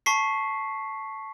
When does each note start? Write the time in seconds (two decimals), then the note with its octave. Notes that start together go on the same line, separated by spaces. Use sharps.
0.06 A5 C#6 B6 C7